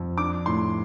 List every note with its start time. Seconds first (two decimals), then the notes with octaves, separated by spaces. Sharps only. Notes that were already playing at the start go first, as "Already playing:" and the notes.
Already playing: F2
0.18 D4 D6
0.46 A2 C6